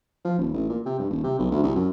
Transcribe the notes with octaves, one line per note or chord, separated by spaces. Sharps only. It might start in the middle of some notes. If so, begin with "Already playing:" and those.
F3
D#1
A1
A#2
C3
G2
D#1
C3
B1
D2
C2
F#2